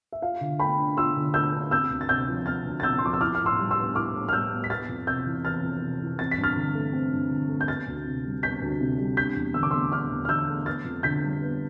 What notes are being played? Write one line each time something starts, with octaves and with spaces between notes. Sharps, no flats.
E5
F4 F5
D3
A3 G5 B5
D4
F4 C6 E6
D3
A3 E6 G6
D4
C4 E6 G6
D2
A6
C3 E6 G6
F3
C4 F6 A6
D2
A6
C3 E6 G6
C6
F3 D6
E6
E4 D6 F6
F6
A2
C6 E6
G3
C6 E6
B3
E4 D6 F6
A2
F6
G3 E6 G6
B3
B6
B3 F6 A6
F2
C3 E6 G6
E3
B3 F6 A6
F2
C3
E3
C4 A6
B6
G2
F6 A6
D3
A3
C4
G2
D3
A3
G6
B3 F6 A6
D2
C3
G3
B3 G6 B6
D2
C3
G3
D4 G6 B6
E2
D3 E6
D6
A3 C6 E6
D4 D6 F6
E2
F6
D3 E6 G6
A3
B3 F6 A6
F2
D3 G6 B6
G3
B3